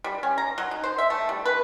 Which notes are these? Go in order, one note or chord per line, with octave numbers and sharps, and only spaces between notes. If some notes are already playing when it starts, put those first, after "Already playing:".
G3
C#4
A#5
F#3
D#4
C5
E5
A3
G3
B4